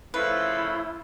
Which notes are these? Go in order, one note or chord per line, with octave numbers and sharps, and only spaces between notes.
C#3 F3 A3 E4 B4